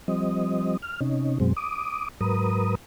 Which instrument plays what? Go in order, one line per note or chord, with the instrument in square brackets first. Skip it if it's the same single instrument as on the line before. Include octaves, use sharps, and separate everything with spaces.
[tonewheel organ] F3 G3 C4 D#5
F6
C3 C#4 D#4
F#2 B2 F#3 G#3 C4
D6 D#6
G#2 F#3 A#4 B4 D#6